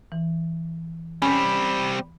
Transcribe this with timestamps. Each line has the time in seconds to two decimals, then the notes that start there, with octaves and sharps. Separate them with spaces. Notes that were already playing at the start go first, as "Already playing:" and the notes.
0.12 E3
1.22 G3 C4 C#4 B5